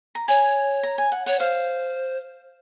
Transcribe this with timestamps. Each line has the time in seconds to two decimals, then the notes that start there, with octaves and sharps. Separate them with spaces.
0.15 A#5
0.28 C#5 G#5
0.83 A#5
0.98 G#5
1.12 F#5
1.26 C#5 F#5
1.40 C5 F5